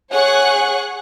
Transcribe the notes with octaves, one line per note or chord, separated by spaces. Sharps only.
G#4 C#5 F#5 C#6 F#6